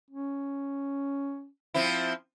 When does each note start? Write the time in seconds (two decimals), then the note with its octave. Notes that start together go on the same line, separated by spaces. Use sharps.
0.10 C#4
1.74 F3 C4 E4